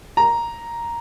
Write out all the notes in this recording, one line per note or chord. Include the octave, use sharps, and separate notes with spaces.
A#5